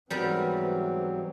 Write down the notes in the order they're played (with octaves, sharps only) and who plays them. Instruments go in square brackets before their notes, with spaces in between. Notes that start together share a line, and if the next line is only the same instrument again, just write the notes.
[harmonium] G#2 F#3 C4 [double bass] E3 [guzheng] G3 B3 A#4